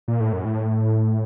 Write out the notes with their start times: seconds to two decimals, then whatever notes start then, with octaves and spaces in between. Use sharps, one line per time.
0.08 A#2
0.20 A2
0.33 F#2
0.45 A2